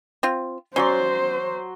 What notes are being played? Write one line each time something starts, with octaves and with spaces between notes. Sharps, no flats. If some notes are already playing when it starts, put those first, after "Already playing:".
C4 F4
F#3 C#4 C5 D5 C6